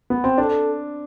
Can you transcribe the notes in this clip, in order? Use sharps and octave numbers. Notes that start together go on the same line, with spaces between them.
B3
C4
D4 A4